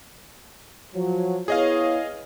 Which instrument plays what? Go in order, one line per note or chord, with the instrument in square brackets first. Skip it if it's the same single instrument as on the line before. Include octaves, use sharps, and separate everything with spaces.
[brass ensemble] F3 F#3
[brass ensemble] B3 E4 C#5 [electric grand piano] G#4 D#5 F5